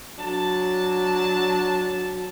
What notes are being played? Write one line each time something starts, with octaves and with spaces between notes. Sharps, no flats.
F#3 D4 A5